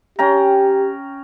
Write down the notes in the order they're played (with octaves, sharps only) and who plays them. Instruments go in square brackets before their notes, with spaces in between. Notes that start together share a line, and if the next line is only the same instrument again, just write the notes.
[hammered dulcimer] C#4 G5 A#5 [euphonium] G4